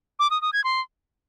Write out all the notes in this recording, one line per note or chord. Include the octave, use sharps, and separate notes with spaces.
D6
D#6
D#6
G#6
C6